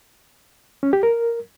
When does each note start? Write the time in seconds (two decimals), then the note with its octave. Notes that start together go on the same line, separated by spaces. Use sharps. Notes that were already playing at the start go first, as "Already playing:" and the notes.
0.83 C#4
0.93 G4
1.03 A#4